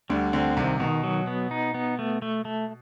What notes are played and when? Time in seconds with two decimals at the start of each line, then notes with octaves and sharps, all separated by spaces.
0.10 D2 D3 G3
0.33 D2 D3 C4
0.57 C2 C3 D#3
0.80 B2 D#3
1.04 F#3
1.27 B3
1.51 D#4
1.75 B3
1.99 A3
2.22 A3
2.45 A3